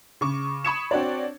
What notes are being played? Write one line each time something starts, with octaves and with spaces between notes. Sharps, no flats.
C#3 C#6 D6
B5 C#6 D#6 G#6 C#7 E7
C4 D4 F#4 C#5 D5